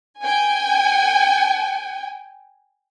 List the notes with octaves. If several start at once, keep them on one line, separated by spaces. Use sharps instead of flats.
G5 G#5